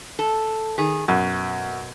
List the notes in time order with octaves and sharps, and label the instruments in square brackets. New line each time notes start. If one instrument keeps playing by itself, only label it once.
[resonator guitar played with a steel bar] A4
D#3 G#4
[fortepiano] F#2 [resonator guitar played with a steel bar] B2